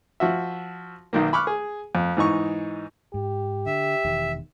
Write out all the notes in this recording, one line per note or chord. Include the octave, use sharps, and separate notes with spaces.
F3 F#4 E5
B1 D#3 A#3
B5 C#6 D6 F6 F#6
G#4
F2
G#2 E3 D#4 C#6
G#2 G4
D3 E5
E1 D#3